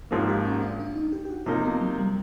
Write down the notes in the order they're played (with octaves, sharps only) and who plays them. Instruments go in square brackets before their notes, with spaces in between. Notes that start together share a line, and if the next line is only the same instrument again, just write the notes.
[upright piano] G#1 G#2 F3 A#3 [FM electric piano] G4
[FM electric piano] G4
C#4
D4
D4
D#4
G4
G4
F#4
[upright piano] C3 F3 A#3 D#4 [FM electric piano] F4
[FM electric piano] B3
F#3
G3